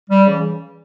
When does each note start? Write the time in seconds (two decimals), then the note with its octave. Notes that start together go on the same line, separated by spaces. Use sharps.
0.10 G3
0.25 C#3 E3